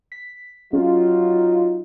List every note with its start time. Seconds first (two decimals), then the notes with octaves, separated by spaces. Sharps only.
0.12 B6
0.73 F#3 C#4 D#4 F4 G#4